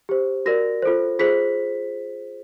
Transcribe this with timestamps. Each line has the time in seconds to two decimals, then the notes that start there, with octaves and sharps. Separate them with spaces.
0.09 G4 C5
0.46 F#4 A#4 D5 A#6
0.82 F4 A4 C5
1.19 F4 G#4 C5 B6